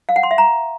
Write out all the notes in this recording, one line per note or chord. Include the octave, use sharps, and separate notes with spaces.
F5
F#5
C6
E5
A#5